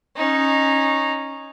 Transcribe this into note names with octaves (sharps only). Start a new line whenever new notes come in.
C#4 D#4